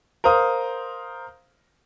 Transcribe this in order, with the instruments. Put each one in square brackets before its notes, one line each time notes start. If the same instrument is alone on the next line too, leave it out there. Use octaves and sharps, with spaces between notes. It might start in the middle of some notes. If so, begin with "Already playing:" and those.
[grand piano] A#4 C5 F5 D#6